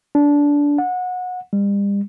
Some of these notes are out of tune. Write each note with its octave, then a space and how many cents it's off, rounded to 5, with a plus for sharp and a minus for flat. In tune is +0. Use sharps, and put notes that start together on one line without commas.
D4 -20
F#5 -25
G3 +40